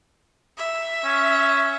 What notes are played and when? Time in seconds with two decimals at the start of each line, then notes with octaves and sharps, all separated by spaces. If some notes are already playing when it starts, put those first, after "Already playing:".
0.58 E5
1.04 C#4